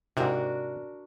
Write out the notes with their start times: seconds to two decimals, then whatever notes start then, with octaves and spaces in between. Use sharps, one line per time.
0.17 G#2 C3 D4 F#4 A#4